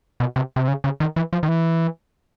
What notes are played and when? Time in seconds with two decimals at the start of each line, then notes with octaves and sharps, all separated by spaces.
0.20 B2
0.36 C3
0.56 C3
0.68 C#3
0.84 C#3
1.00 D#3
1.16 E3
1.33 F3
1.43 D#3
1.48 E3